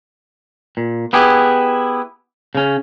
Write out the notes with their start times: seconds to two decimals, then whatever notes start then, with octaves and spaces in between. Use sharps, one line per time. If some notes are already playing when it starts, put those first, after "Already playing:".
0.77 A#2
1.13 B3 E4 G4 G#4
2.55 C#3 C#4